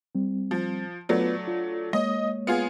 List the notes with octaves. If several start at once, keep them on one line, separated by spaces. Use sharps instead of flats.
G3 C4
F3
F#3 A3 B3 D4 F4 B4
F4
G#3 A#3 C#5 D#5
B3 F4 G#4